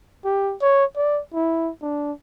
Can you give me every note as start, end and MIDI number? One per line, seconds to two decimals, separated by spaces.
0.25 0.54 67
0.61 0.85 73
0.96 1.21 74
1.34 1.71 64
1.82 2.12 62